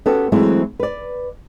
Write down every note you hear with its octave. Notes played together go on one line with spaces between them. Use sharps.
B3 C#4 F#4 G4 A4
E3 F#3 G#3 A3 C4 E4
B4 D5